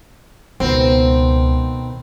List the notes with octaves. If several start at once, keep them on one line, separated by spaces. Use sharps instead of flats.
C#2 B2 D#3 C4